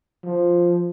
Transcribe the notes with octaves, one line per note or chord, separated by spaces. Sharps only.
F3